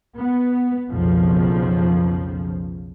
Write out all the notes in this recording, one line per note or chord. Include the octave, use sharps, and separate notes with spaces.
B3
B1 F2 C#3 F3